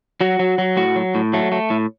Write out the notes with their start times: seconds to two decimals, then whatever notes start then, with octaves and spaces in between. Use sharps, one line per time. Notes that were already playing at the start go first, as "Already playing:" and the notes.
0.21 F#3 F#4
0.39 F#3
0.58 F#3
0.77 A2 F#4
0.96 F#3
1.15 A2
1.33 F#3 A3
1.52 A3
1.70 A2